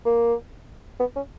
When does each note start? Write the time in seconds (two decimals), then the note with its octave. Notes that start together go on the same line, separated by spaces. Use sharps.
0.05 A#3
1.00 B3
1.16 C#4